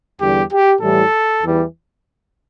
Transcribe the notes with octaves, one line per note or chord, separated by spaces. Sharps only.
E2 D3 G3 G4
G4
A2 E3 G3 A4
E2 E3 G3